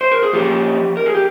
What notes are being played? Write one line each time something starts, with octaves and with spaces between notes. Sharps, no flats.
C5
A#4
G#4
F3 A#3 C#4 G4
A#4
G#4
G4